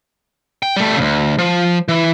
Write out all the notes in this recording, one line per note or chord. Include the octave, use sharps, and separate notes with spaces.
G5
G3 A3
D2 C#3
F3
E3